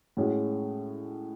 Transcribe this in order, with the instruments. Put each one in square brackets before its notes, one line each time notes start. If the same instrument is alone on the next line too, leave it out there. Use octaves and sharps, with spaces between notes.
[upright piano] A2 G#3 C#4 F#4